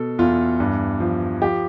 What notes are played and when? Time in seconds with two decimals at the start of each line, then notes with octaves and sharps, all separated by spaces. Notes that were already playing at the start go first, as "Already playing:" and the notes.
Already playing: B2 A4
0.19 E2 F4
0.60 G2
1.00 F3
1.42 F3 G4